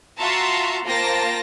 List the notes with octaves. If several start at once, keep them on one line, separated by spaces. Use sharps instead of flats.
F4 F#4 E5 A5 A#5 C6
A#3 F4 C5 G5 A5 A#6